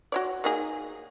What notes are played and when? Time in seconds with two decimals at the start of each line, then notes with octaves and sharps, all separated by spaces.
0.12 F#4 C#5 D5
0.44 A#3 D#4 G#4